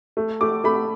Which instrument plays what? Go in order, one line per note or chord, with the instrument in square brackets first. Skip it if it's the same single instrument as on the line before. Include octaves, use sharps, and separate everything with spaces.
[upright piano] A3
A3 D6
A3 B5